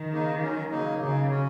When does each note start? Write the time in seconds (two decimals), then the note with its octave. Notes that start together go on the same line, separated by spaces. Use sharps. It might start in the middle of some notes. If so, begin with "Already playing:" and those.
Already playing: D#3
0.12 C#3 A#3 D#4
0.41 F#3 C#4
0.71 C#3 F#3 A#3 D#4
1.01 C#3 F#3 A#3 D#4
1.30 F#3 C#4